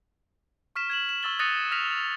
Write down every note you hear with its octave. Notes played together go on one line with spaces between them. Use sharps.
C#6 F6 B6 E7
G#6 E7 F#7
E7
C#6 E6 A6 G7
D#6 F#6 A6 A#6 C#7 D#7
F6 A#6 B6 F7